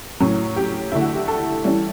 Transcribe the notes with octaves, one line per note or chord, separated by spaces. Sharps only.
A2 F#3 C#4
G4
D3 A3 E4
F#4
G4
A4
E3 G3 C#4 E4